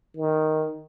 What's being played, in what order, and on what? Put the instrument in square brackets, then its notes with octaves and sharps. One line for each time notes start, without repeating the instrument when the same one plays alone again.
[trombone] D#3